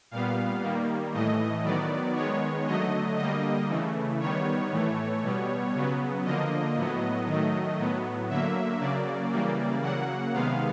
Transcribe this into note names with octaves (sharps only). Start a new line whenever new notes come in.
A#2 G3 B3 F5
D#3 G3 A#3
A2 E3 A3 D#5
D#3 F#3 B3 D5
D#3 G#3 B3 C#5
D3 F#3 A3 D#5
D3 G3 A#3 D#5
C#3 E3 A3
D#3 G3 B3 C#5
A2 E3 A3
B2 G3 B3
C#3 F#3 B3
D3 F3 A#3 D#5
A2 F#3 B3
D#3 F#3 A3
A2 F#3 B3
D3 F#3 A#3 E5
C#3 F#3 A#3 D5
C#3 E3 G3 A#3
C#3 F#3 A#3 F#5
C3 D#3 G#3 B3 F5